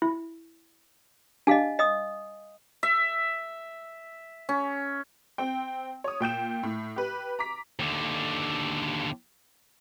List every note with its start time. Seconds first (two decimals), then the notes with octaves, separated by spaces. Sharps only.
0.02 E4
1.47 D4 G4 D#5 F5 G#5
1.79 D#5 D#6
2.83 E5
4.49 C#4
5.38 C4 G5
6.04 C#5 D#6
6.20 A#2 G5 G6 E7
6.63 A2
6.96 G4 B4
7.39 A#5 D6 B6
7.79 D#2 D3